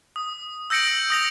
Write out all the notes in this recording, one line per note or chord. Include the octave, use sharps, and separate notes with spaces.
D#6
E6 G6 A#6 C#7 D7 F#7
D#6 A#6 F7